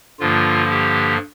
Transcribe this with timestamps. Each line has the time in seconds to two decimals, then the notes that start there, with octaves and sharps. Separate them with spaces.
0.20 G2 D3 F3 A#3 F4
0.69 G4